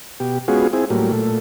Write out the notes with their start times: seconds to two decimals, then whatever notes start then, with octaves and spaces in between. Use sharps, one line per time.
0.20 B2 G4
0.48 G#3 B3 C#4 F4 F#4 G#4
0.73 C4 E4 G#4
0.90 A2 F#3 G3 A#3
1.12 A#2 A3